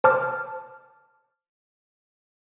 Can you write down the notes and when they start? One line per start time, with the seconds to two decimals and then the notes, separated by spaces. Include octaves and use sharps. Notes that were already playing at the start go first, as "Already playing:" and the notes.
0.04 C5 A5 D6 F6